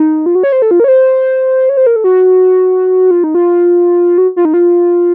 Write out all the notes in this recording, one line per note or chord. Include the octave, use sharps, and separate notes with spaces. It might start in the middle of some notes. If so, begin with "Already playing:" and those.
Already playing: D#4
F4
F#4
C#5
C5
A4
F4
A#4
C#5
C5
C#5
C5
A#4
A4
F#4
F4
D#4
F4
F#4
F4
D#4
F4